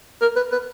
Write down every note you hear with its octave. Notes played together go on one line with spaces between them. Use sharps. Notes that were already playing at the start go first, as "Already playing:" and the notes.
A#4
B4
B4